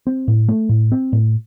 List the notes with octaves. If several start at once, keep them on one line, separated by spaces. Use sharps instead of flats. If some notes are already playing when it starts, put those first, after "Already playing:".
C4
A2
A3
A2
C4
A2